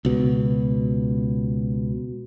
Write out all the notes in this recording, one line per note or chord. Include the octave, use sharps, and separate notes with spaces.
C#2 B2